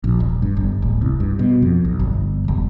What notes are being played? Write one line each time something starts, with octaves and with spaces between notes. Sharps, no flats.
A#1
D#1
G2
G1
D1
C2
G2
B2
F2
B1
G1
E1